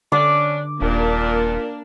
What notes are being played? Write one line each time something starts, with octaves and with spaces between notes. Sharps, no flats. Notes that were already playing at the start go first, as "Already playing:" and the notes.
D3 C#4 D4 D6
D#1 A#2 A#3 D4 A#4